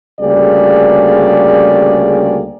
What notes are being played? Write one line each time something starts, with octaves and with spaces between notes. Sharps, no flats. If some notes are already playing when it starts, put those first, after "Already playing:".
D2 C#3 G3 A#3 G#4 D5